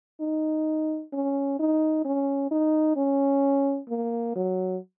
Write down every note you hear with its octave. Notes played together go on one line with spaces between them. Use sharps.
D#4
C#4
D#4
C#4
D#4
C#4
A#3
F#3